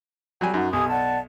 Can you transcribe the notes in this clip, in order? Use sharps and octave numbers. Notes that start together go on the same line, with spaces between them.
F#3 G3 G5 G#5
F#2 D#4 F#4 F#5
B1 G4 G#5 D#6
D5 F#5 A5